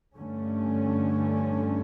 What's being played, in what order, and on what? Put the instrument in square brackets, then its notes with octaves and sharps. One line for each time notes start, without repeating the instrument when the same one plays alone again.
[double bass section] G2 D3 A3 C#4